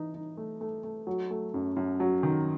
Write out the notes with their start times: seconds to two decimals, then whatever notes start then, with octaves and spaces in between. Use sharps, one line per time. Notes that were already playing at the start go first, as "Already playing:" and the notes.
Already playing: E3 D#4
0.14 D#4
0.37 A3
0.61 A3
0.83 A3
1.07 F#3
1.31 A3
1.54 F#2
1.76 F#2
2.00 F#3
2.23 D#3